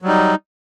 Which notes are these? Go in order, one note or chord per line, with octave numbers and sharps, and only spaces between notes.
F#3 G3 D#4